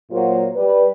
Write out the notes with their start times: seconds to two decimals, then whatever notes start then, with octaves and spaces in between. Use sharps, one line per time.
0.11 A#2 F#3 A#3 F4 F#4 C5
0.55 G3 B4